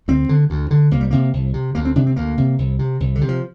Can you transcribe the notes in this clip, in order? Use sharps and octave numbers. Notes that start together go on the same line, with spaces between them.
D2 C4
D3
D2
D3
C2 A#3
G3
C3 A#3
C2
C3
D2 A#3
C4
C3 D4
C4
D2 A#3
C3
C2
C3
C2
D3
C3
F3